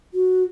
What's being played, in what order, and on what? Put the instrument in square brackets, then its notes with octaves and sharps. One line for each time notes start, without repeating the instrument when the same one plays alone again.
[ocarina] F#4